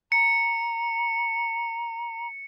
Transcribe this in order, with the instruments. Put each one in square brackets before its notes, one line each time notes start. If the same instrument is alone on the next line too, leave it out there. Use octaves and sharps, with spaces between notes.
[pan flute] A#5 [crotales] C#7